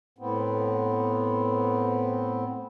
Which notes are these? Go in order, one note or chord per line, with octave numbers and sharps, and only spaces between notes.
A2 B3 C4